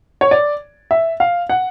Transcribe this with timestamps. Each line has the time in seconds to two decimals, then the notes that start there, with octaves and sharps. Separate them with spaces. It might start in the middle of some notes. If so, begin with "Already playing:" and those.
0.21 C#5
0.31 D5
0.91 E5
1.20 F5
1.49 F#5